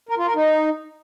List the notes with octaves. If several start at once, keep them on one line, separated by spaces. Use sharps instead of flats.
A#4
F4
A#4
D#4